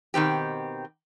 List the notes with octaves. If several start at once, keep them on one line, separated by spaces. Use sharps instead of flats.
B2 D#3 C4 G4